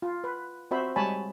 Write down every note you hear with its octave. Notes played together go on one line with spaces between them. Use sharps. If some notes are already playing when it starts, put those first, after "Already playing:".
F4
B4
C4 F#4 C5 E5 B5
G3 G#3 C#5 G#5 A5 B5